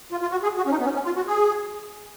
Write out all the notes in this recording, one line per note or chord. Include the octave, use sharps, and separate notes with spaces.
F4
F4
F#4
G#4
F#4
C#4
D#4
B3
C#4
C#4
F4
F#4
G#4